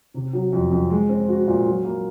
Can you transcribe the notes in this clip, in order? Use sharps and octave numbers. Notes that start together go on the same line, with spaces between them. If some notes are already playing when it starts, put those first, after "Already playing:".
C3
F#3
F2
F2
G#3
C4
F#4
A#2
F#3
A#3